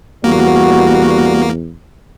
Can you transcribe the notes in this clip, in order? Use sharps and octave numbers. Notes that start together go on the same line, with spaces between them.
E2 G3 A#3 F#4